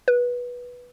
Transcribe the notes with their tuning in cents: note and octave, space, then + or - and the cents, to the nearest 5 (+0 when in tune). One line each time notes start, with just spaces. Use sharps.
B4 -15